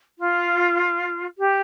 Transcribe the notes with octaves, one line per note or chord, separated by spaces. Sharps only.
F4
G4